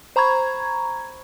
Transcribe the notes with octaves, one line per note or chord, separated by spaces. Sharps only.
C5 A#5 B5 C#6 G#6